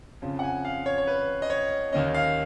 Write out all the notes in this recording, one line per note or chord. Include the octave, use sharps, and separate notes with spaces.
F2 C#3 F3
F#5
G#5
F5
C#5
C#5
B4
D#5
C#5
D#2 D#3 A#3 C#4 D#5
F5